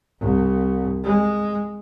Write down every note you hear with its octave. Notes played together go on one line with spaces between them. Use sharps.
C2
G#3